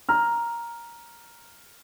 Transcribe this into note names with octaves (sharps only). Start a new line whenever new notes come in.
A#5 F6